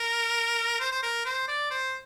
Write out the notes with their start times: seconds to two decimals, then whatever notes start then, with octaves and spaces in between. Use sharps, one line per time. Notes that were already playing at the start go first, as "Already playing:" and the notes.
Already playing: A#4
0.80 C5
0.92 C5
1.03 A#4
1.25 C5
1.48 D5
1.71 C5